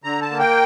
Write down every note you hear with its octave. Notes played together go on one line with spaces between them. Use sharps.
D3 A#5
A5
A#3
G5